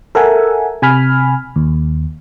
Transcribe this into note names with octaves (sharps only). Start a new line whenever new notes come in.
A4 A#4 E5 F#5 G#5
C3 G#5 B5 F6
D#2